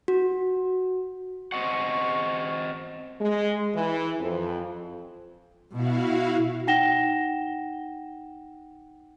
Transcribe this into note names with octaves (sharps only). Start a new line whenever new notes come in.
F#4
C4 D#5 F#5 C#6
G#3
E3
F2
B2 E4 F#4 F5
D#4 F#5 G5 A#6 E7 G7